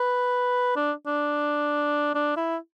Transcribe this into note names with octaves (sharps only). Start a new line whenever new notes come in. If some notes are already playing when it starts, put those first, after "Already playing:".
Already playing: B4
D4
D4
D4
E4